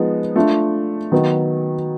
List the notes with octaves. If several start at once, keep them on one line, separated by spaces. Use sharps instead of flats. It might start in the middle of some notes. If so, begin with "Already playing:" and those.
Already playing: F3 G#3 B3 D#4
A3 D4 F4
D#3 F#3 B3